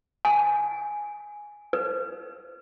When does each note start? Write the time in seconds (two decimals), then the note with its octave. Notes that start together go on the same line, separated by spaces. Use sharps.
0.25 G#5
1.73 B4